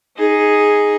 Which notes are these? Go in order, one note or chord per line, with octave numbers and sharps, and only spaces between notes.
D#4 G#4